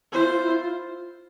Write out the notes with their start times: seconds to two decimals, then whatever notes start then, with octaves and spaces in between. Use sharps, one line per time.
0.12 E4 C5
0.23 F4
0.34 F4
0.44 E4
0.54 F4